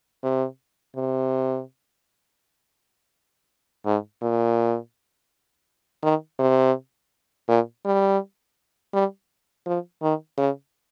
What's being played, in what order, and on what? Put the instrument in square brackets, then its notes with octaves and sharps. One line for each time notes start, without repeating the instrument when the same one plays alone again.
[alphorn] C3
C3
G#2
A#2
D#3
C3
A#2
G3
G3
F3
D#3
C#3